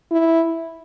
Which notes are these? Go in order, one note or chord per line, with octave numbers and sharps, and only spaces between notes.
E4